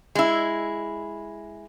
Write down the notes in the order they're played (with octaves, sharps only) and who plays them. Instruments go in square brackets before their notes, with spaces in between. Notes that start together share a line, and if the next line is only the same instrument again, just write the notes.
[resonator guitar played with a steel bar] G#3 E4